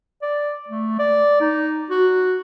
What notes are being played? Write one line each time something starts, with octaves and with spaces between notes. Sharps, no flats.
D5
A3
D5
D#4
F#4